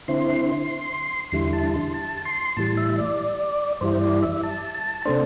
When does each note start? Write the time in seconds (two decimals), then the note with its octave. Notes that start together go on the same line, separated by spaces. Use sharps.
0.08 D3 C4 E4 C6
1.32 E2 D3 G3 E4 C6
1.53 A5
1.74 C6
1.94 A5
2.25 C6
2.57 A2 E3 G3 A5
2.77 E5
2.98 D5
3.81 G2 E3 G3 E4 C5
4.01 D5
4.23 E5
4.43 A5
4.75 A5
5.05 C3 A3 D4 C5